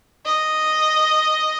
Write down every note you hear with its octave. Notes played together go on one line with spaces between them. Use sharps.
D#5